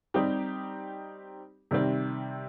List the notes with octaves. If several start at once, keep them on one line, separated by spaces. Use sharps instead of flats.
G3 C4 D#4 G4
C3 D#3 G3 C4